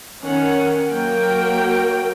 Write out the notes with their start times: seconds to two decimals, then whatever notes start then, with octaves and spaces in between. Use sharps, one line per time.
0.24 D#3 C#4 F#5
0.89 F#3 A#3 F#4 A#4 G5